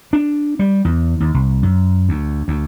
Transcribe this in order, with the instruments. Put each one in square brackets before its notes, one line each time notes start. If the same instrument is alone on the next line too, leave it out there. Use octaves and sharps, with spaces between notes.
[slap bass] D4
G3
E2
D#2
C2
F#2
D2
D2